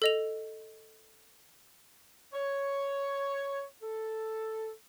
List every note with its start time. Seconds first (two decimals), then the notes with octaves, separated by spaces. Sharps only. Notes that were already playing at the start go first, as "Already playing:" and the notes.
0.02 A4 D#5 F7
2.33 C#5
3.82 A4